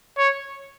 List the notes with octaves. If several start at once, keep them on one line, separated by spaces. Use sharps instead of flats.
C#5